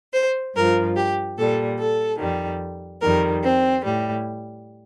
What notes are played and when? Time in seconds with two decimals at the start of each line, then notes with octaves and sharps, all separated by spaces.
0.13 C5
0.55 G2 F3 A#4
0.96 G4
1.37 A#2 G3 A4
1.79 A4
2.20 F2 D#3 G3
3.01 F2 D#3 G3 A#4
3.43 C4
3.84 A2 G3